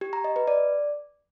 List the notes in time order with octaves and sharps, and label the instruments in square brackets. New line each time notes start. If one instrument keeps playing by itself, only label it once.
[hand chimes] G4
A#5
D#5
B4
D5